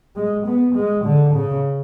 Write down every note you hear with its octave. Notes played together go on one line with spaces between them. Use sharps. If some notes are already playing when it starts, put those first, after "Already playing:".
G#3
B3
G#3
D3
C#3